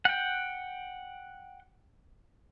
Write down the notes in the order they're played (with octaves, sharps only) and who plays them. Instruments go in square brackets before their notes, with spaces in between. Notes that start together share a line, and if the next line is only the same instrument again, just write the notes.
[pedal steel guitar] F#5 G5